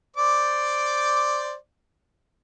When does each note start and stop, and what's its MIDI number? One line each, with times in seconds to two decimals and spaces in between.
0.16 1.54 72
0.16 1.54 74
0.16 1.54 86